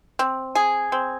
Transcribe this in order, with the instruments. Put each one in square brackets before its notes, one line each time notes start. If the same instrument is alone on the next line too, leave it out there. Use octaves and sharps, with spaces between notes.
[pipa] C4
G#4
C4